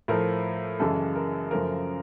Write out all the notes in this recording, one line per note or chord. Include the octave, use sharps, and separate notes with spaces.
A2 F3 A3 A#4
F#2 C#3 E3 G#3 A4
A#4
F#2 C#3 F3 A3 A#4